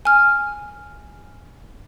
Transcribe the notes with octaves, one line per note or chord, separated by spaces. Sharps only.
G#5 F6